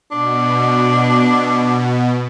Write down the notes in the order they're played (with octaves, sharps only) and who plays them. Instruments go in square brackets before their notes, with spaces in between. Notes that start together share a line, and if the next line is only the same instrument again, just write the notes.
[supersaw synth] B2 [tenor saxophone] D4